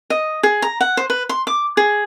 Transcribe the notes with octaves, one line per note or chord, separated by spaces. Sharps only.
D#5
G#4
A#5
F#5
C5
B4
C6
D6
G#4